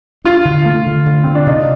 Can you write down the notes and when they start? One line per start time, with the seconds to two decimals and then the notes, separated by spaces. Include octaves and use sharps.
0.25 D4 F4
0.45 D3
0.66 A3
0.86 D3
1.06 D3
1.24 D3 C4
1.35 D4
1.47 C3 D#4